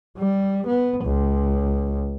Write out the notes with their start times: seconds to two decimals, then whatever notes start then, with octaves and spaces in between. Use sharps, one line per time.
0.18 G3
0.67 B3
1.05 C#2